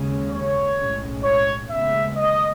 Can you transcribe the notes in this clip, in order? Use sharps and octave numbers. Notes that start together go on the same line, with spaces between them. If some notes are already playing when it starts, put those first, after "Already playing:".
Already playing: D#2 C#3 G#3 C#4
C#5
B1 A2 G#3 C#4
C#5
D#2 C#3 G#3 B3 E5
D#5